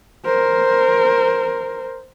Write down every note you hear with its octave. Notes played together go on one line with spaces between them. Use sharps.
A#4 C5